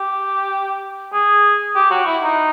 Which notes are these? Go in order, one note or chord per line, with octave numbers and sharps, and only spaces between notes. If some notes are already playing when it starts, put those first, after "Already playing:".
Already playing: G4
G#4
G4
F#4
E4
D#4